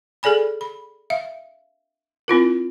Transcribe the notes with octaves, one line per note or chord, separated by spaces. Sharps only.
G#4 A4 D5 G#5 B5
B5
E5 F5
C4 E4 F4 A#4